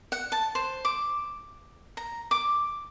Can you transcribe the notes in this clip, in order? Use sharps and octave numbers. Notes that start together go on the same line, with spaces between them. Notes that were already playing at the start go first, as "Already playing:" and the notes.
F#5
A5
C5
D6
A#5
D6